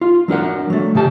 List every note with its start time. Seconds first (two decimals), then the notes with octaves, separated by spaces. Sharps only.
0.01 F4
0.28 F#3 D4 A#4 F#5
0.70 F#3 A3
0.95 C#3 G4 A5